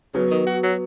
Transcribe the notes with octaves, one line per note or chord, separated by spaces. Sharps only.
C#3 F#3 B3
D#3
F#4
F#3